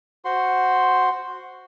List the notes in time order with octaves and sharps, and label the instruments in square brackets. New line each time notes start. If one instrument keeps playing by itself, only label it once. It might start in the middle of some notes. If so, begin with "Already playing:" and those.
[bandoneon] F#4 C5 F#5 C6